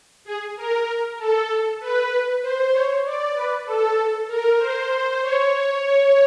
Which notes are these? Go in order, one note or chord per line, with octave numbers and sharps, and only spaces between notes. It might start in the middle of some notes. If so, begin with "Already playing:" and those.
G#4
A#4
A4
B4
C5
C#5
D5
B4
A4
A#4
C5
C#5